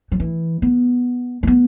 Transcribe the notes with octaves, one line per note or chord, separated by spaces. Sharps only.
F#3
E3
B3
A3
B3